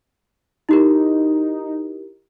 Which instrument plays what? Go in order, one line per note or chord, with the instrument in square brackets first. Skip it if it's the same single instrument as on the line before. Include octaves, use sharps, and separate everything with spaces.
[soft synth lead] D#4 [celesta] E4 G4 A#4